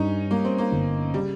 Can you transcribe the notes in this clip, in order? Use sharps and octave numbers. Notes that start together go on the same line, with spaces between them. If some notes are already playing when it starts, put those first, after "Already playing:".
Already playing: G2 C#4 D#4
G3 A#3
C4
A#3
G1
C#3 G3